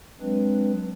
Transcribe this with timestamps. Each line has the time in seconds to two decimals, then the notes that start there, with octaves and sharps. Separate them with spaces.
0.20 F#3 G#3 C4 D4 B4